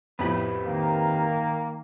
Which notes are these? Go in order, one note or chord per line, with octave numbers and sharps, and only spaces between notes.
F2 A2 C4 G4 B4 B5
D#3 A#3